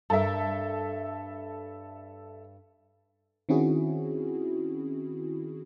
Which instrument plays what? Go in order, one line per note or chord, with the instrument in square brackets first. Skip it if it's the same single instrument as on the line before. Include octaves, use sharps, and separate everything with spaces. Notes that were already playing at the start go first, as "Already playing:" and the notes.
[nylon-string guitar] G2 A#4 [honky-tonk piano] A4 E5
[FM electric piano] D#3 C4 C#4 E4 F#4 G#4